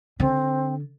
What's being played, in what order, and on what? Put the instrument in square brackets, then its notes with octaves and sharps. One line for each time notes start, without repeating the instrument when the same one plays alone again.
[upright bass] D3 [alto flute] C4